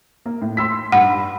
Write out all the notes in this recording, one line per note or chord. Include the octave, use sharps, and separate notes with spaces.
A#3
A2
C6 E6 B6
G2 F#5 B5